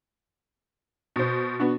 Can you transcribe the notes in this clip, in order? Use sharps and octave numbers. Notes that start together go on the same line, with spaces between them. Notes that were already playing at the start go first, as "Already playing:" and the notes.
B2 C5
B3 D4 F#4